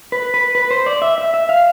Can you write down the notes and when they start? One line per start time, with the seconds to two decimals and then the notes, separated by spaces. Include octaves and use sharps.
0.12 B4
0.34 B4
0.55 B4
0.71 C5
0.86 D5
1.02 E5
1.18 E5
1.34 E5
1.49 F5